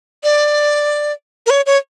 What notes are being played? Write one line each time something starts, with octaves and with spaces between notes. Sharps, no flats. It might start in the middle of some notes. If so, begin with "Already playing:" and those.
D5
A#4
C#5
C#5